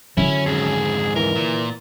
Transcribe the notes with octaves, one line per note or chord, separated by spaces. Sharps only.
F#2 D3 D#3 C#4 E4
F2 G#2 G#4
E3 A#4
A#2